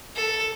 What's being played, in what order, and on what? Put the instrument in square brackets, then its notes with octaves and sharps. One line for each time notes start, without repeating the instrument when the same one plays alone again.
[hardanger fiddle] A4